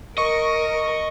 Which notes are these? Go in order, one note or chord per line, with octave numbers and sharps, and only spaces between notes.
A#4 D#5 C#6